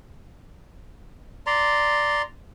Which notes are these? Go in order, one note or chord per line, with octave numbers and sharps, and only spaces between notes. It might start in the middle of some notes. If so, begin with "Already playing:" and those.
D5 A#5 C6